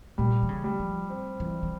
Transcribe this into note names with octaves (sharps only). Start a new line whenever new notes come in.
A#2 G3
E3
C#3
G3
F3
C4
E3
E3